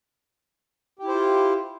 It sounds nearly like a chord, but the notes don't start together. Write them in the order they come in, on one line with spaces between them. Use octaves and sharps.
G4 E4 C5 F4